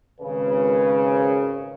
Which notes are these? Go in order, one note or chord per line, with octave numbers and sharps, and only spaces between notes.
G#1 C#3 B4